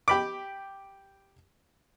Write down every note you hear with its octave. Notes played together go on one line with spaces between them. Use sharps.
G4 B5 D6